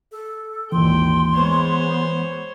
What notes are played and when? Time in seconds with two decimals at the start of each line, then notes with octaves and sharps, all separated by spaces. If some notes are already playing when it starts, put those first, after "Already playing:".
0.12 A4
0.72 G#1 D#2 A#2 E3 G5 C6
1.35 G#3 B3 C5 C#5